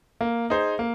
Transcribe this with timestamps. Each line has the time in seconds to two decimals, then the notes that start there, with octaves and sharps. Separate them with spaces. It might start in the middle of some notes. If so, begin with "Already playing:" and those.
0.21 A#3
0.50 D#4 G#4 C5
0.79 A#3